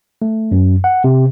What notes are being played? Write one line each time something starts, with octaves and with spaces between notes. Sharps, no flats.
A3
F#2
F#5
C3